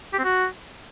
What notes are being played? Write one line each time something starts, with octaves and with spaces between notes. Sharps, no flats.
G4
C4
F#4